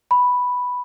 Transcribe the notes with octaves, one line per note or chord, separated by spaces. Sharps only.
B5